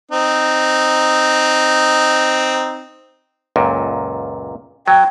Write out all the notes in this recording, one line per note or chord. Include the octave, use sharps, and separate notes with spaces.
C4 D#4
C#2 F#2 A#2
F#3 G5